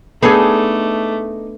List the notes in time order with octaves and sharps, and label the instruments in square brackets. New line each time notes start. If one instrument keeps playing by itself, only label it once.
[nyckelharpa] A3 D6 [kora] B3 D4 [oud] D#4 G#4 A4